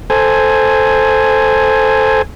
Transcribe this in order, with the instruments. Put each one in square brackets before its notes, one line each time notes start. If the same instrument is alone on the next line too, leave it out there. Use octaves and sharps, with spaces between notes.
[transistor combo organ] A4 C5 G#5